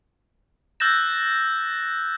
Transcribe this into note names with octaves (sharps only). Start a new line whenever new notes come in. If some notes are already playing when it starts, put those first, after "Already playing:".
E6 F#6 G6 A6 A#6 E7